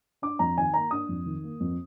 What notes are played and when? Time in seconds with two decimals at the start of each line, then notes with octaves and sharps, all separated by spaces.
0.22 D4 D6
0.39 F2 A#5
0.57 D#3 G#5
0.74 A#3 A#5
0.91 D4 D#6
1.09 F2
1.26 D#3
1.44 A#3
1.60 F2